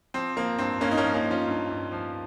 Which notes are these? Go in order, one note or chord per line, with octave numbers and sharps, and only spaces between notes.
F3 C4
F3 A#3
G2 C4
G2 A#3 C#4
D#4
A#3 C#4
F3
A#3 C#4
F3
C#4 F4
G2
G2
F3